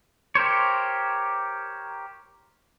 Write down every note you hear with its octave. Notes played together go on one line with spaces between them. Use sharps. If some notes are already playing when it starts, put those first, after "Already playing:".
G4 A#4 C5 C#5